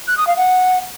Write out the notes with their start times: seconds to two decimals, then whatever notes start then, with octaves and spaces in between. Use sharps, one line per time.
0.07 F#6
0.17 D#6
0.27 F5
0.37 F#5